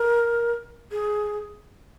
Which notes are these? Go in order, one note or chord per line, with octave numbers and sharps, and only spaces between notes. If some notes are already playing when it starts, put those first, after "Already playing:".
Already playing: A#4
G#4